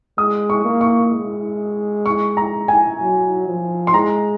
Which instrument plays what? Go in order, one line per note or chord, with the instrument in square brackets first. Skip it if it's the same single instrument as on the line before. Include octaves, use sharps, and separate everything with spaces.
[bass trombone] G#3 [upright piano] D#6
[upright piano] C#6
[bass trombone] A#3
[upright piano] C#6
[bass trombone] G#3
[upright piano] C#6
A#5
G#5
[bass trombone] F#3
F3
[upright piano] C6
[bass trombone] G#3 [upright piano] A#5